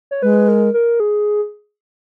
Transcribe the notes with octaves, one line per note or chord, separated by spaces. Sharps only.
C#5
G#3 B4
A#4
A#4
G#4